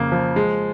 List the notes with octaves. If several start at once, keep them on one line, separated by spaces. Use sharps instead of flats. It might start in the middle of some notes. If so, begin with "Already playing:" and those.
Already playing: F2 C#3 A#3
F3
G#3